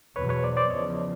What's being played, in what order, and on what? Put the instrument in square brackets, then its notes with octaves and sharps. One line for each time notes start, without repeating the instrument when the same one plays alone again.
[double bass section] E2 B2 F#3 [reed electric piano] B4 C#5
[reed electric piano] B4 C#5
C5 D5
C5 D5
[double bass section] E2 C#3 F3 [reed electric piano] C#5 D#5